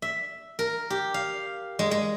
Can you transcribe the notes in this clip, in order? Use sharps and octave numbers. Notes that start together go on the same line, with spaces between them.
E5
A#4
G4
F5
G#3
G#3